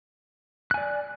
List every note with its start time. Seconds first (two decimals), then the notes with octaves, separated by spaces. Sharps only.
0.71 F#6
0.74 G#5
0.78 D5